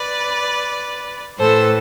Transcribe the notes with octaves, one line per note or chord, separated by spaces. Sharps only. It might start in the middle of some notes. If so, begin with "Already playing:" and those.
Already playing: B4 D5
A2 E3 A4 C5